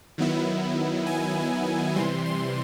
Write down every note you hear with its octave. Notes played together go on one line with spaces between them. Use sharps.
D#3 F#3 B3 E4
G#5
C3 E3 G3 C6
C6